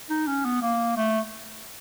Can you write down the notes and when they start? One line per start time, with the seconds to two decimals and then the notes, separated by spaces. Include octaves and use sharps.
0.10 D#4
0.27 C#4
0.45 B3
0.62 A#3
0.97 A3